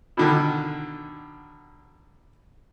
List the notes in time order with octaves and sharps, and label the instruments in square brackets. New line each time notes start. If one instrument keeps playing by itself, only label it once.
[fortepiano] B2 D3 D#3